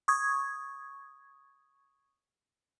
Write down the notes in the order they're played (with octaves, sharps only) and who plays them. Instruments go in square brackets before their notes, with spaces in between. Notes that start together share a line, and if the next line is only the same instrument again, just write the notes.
[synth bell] C#6 D#6 G#6